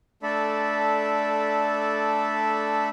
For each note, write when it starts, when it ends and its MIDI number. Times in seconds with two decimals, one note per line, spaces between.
0.23 2.89 57
0.23 2.89 62
0.23 2.89 69
0.23 2.89 74
0.23 2.89 76
0.23 2.89 83